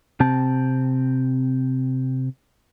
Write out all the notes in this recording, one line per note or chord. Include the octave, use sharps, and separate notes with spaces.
C3 C4 A5